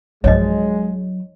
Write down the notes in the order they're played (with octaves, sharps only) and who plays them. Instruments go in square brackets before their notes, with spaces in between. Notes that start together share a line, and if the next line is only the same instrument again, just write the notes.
[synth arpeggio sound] B1 G2 F3 [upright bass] F#3 D4 [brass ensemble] G#3 [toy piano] C#5 D#5